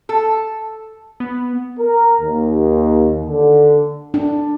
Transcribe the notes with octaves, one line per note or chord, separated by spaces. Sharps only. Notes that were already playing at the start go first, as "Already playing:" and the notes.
A4
B3
A#4
D#2
D3
D4